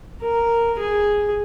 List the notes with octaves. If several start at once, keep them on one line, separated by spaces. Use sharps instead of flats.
A#4
G#4